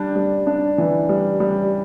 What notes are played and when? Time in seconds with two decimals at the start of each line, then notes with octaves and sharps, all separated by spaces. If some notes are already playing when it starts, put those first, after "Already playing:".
Already playing: G3 D4
0.16 G3
0.47 D4
0.78 E3
1.09 G3
1.40 G3